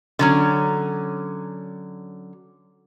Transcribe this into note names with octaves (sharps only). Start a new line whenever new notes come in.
D3 F#3 C#4